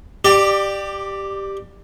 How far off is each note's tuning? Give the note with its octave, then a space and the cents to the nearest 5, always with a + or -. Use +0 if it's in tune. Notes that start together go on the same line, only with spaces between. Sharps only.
G4 +0 D5 +25